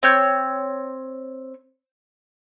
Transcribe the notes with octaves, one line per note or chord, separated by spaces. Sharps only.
C4 C#5 G6